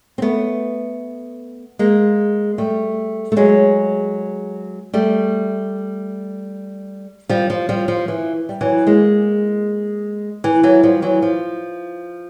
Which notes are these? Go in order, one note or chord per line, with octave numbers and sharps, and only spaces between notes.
C4
A3 B3
G#3 A#3
G3 A3
A3
F#3 G#3
G3 A3
F3 G3
F3
F3 G3
F3
E3
G3
E3 F#3
G#3 A#3
E3
E3 F#3
F3 G3
E3 F#3
F3